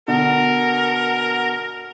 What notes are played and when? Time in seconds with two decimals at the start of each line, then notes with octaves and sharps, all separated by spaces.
0.08 B2 D3 A#4 F#5